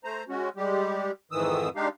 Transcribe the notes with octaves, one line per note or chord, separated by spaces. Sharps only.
A3 C5 A#5
G#3 C#4 F#4
G3 G#3 G4
F2 G#2 D#3 E3 D#6 E6
G#3 D4 D#4 G4 F5